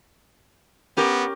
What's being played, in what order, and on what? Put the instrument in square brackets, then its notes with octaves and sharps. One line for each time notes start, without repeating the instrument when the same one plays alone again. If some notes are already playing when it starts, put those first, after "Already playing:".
[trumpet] B3 [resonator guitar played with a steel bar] C#4 G4 A#4